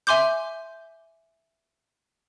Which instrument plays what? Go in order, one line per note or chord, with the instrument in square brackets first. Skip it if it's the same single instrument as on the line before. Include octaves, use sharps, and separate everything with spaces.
[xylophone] E5 G#5 C6 D6 G6